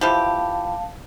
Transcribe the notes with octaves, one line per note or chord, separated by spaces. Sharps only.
E3 F3 G4 F5 A5